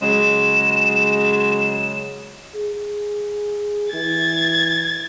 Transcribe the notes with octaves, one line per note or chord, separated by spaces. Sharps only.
C#3 F#3 G#3 E7
G#4
E3 G#6 A6